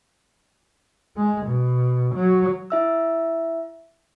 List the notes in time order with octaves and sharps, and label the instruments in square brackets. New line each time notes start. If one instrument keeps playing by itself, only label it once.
[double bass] G#3
B2
F#3
[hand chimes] E4 E5 E6